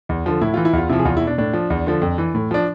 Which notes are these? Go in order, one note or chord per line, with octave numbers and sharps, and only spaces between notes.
E2
D3 F3
A2 E4
E3 F4
E4
E2 F4
C3 F3 E4
G#4
E2 F4
E4
B2
D4
A2 D4
F3
E2
D3 F3
F2
E3
A2
F3 D4